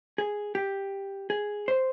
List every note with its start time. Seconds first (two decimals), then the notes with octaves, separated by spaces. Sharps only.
0.18 G#4
0.55 G4
1.30 G#4
1.68 C5